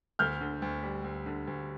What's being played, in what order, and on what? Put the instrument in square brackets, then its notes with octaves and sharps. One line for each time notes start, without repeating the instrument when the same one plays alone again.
[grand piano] D2 [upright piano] F6 G6
[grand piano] D3
D2
G3
D2
D3
D2